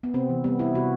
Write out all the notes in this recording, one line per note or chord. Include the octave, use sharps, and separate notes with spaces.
B3
C3 C4
E3
G3 B3
C3 E4
C3 F#4